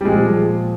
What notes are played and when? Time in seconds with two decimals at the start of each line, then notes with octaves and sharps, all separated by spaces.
0.01 G3
0.05 A#2 F3 G#3